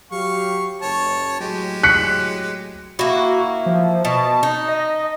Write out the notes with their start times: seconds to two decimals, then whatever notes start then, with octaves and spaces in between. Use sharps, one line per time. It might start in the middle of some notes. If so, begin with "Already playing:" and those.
0.11 F#3 G4 F5 C#6
0.82 F#1 C#5 A5
1.40 A2 F#3 G#3 G4
1.83 F#6 B6 C#7
2.99 A#3 E4 F#4
3.66 F3
4.05 B2 A5
4.43 D#4
4.68 D#5